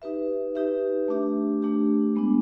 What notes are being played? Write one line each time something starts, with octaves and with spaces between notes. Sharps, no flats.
D#4 G4 B4 E5
D#4 G4 B4 E5
A3 D4 G4
A3 D4 G4
G#3 B3 D4